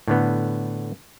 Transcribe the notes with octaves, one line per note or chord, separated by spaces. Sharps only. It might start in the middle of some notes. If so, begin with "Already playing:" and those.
A2 D3 B3